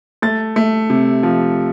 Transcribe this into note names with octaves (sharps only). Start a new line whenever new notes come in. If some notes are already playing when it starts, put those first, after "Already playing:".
A3 A6
A3
C3
F3